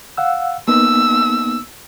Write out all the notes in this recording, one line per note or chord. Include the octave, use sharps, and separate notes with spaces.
F5 F#5 E6
A#3 B3 D#4 E6